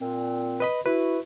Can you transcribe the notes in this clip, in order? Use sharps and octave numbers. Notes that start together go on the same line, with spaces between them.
A#2 C4
B4 D#5 B5
E4 F#4 B4